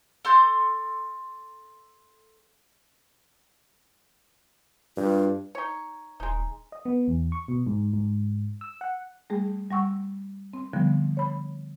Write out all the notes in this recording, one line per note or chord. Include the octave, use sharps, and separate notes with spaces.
A4 C6 G6
G2 F4
D#4 C#5
D#1 G#3 D#4
D#5
B3
E2
C#6
B2
G#2
G#2
E6
F#5
G3 A3 G#4
G3 F#5 C#6 E6
C4
D3 F3 G3 B3 C4
C#5 B5